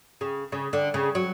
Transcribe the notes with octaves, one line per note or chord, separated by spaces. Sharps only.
C#3
C#3
D3
C#3
F#3